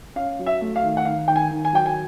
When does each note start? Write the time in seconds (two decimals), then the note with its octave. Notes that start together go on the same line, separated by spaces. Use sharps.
0.16 C#4 F5
0.39 F#3
0.46 E5
0.61 A3
0.76 F5
0.83 D#3
0.97 F#5
1.05 D#3 F5
1.28 D#3 G5
1.36 G#5
1.51 D#3
1.65 G#5
1.73 F#3 G5
1.86 G#5